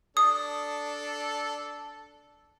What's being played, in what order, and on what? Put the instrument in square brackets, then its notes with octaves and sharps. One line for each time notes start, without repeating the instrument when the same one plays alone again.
[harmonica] D4 A4 [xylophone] D#6